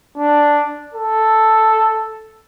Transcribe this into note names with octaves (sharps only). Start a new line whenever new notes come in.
D4
A4